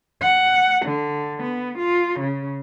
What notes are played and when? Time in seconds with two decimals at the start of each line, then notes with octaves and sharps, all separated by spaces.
0.21 F#5
0.86 D3
1.43 B3
1.79 F4
2.20 C#3